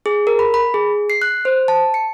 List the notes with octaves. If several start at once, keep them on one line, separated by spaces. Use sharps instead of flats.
G#4
A#4
B5
B5
G#4
C7
F#6
C5
A5
C#7